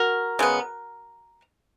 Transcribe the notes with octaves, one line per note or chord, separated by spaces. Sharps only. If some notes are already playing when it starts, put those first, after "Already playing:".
Already playing: F#4 A#4
C#3 G#3 B3